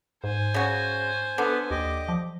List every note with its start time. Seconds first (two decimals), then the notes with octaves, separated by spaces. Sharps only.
0.24 G#2 C5 G#5
0.54 C#3 F#4
1.38 D3 B3 B4
1.71 D#2 G4 D#5 D6
2.09 F3